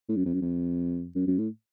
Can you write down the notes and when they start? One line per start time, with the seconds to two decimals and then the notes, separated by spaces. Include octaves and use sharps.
0.09 A2
0.16 F#2
0.25 F2
0.34 F#2
0.42 F2
1.15 F#2
1.27 F#2
1.38 A2